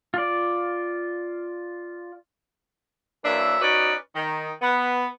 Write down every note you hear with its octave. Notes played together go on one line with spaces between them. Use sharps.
F4 D5
F#2 E3 A#3 D4 E5
C#4 D#4 F#4 B4 D5
D#3
B3